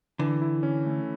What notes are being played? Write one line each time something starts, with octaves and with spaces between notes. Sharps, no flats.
D3 E3
E4
C#4
A3